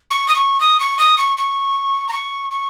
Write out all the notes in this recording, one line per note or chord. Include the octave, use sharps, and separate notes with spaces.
C#6
D#6
C#6
D#6
C#6
D#6
C#6
C#6
A#5
C#6
C#6